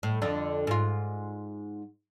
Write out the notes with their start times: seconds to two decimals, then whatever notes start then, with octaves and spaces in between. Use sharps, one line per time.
0.03 A2
0.22 F2 D3 D4
0.67 G#2 F4